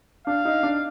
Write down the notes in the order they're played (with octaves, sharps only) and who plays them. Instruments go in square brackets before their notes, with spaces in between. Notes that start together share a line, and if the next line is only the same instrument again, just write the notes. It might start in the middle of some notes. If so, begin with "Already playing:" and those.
[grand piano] D4 [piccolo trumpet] F5
[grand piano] D#4
D4